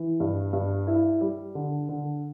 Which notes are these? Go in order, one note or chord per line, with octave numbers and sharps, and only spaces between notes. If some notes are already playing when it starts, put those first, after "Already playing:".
Already playing: E3
G2
G2
E4
G3
D3
D3